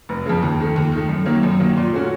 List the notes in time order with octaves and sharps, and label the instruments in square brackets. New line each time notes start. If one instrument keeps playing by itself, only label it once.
[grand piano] F1
F2 C#3
D#2
D#3 A3
D#2
D#3 A3
F#2
D#3 F#3 A#3
F#2
D#3 F#3 A#3
A#2
A3 C#4 F#4